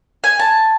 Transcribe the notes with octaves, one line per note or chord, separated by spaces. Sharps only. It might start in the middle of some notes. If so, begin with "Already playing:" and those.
G#5
A5